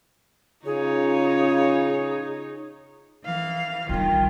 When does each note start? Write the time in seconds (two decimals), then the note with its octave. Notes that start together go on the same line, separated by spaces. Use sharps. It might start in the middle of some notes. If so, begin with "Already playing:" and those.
0.66 C#3 D#4 F4 G#4 C#5
3.25 E3 F5
3.89 A#1 D#3 G3 F4 G5